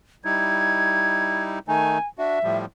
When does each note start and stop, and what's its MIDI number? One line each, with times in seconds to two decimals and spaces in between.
0.25 1.59 55
0.25 1.59 63
0.25 1.59 64
0.25 1.42 92
1.68 1.98 51
1.68 1.98 57
1.68 1.98 63
1.68 2.06 80
2.18 2.39 62
2.18 2.39 66
2.18 2.58 76
2.43 2.65 45
2.43 2.65 53
2.43 2.65 55